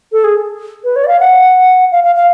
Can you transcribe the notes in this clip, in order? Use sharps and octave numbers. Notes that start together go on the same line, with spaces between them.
A4
G#4
B4
C#5
D5
F5
F#5
F5
F5
F5